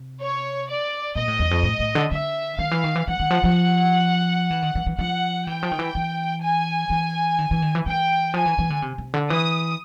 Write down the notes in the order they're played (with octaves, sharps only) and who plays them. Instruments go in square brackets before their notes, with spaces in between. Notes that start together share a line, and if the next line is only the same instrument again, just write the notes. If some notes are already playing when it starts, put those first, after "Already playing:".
Already playing: [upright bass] C3
[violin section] C#5
D5
[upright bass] A#2 [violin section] D#5
[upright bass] A2
E2
F2
A2
A2
D3
[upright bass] D3 [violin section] E5
[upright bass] D#3 [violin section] F5
[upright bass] E3
D#3
E3
[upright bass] E3 [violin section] F#5
[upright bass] D#3
F3
F3
E3
D#3
E3
E3
[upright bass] F3 [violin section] F#5
[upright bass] E3 [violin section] G5
[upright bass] F3
D#3
E3
E3
[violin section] G#5
[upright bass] E3
D#3
E3
D#3
E3
[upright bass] E3 [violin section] G5
[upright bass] F3 [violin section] G#5
[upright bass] E3
E3
D3
C3
C3
D3
[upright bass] E3 [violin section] D#6